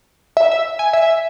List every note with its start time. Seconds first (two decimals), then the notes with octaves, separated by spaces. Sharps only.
0.37 E5
0.51 E5
0.79 G#5
0.93 E5